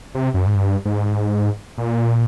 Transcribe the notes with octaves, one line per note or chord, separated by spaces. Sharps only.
C3
F#2
G#2
G2
G#2
A#2